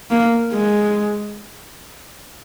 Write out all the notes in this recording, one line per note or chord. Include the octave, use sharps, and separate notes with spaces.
A#3
G#3